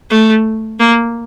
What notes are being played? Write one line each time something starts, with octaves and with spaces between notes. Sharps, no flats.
A3
A#3